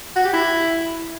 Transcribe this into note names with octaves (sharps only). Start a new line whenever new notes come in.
F#4
G4
E4